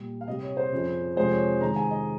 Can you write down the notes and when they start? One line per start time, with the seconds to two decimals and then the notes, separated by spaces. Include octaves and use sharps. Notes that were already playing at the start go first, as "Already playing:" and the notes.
Already playing: A#2 G3
0.21 F5
0.27 C3 G3 D#5
0.42 C#5
0.57 C5
0.72 F2 C#3 F3
1.16 F2 C3 F3 G#3 C5
1.31 C#5
1.61 C3 D#3 G#3 A#5
1.76 G#5
1.91 D#5